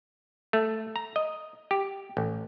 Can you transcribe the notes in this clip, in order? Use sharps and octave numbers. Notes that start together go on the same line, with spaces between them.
A3
A#5
D#5
G4
A1